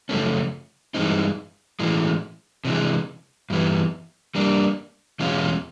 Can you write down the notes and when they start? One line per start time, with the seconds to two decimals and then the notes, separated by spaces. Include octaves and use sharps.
0.09 F#2 C#3 F3 A3 C#4
0.94 G2 E3 G#3 C4 D#4
1.80 A2 E3 G#3
2.65 C3 E3 G#3
3.50 G2 E3 G3 B3
4.35 G3 A#3 D4
5.20 E2 B2 G#3 C#4 F4